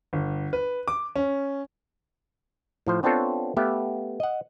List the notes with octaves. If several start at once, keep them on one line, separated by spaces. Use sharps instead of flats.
G1
B4
D6
C#4
A2 F3 C5
B3 C4 D4 F4 A4 C#5
A3 B3 G4 E5 F5
D#5 F#5